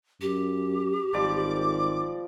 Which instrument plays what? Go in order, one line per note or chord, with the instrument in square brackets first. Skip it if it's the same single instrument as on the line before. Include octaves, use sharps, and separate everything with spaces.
[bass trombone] F#2 [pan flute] G4
[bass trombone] G#1 [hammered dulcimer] F3 G3 D5 [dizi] D6